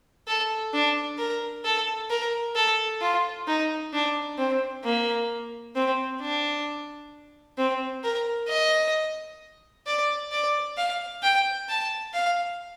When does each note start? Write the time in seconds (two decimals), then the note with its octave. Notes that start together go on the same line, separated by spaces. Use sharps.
0.27 A4
0.73 D4
1.18 A#4
1.65 A4
2.10 A#4
2.55 A4
3.01 F4
3.47 D#4
3.93 D4
4.38 C4
4.84 A#3
5.75 C4
6.21 D4
7.58 C4
8.03 A#4
8.48 D#5
9.86 D5
10.32 D5
10.77 F5
11.23 G5
11.69 A5
12.14 F5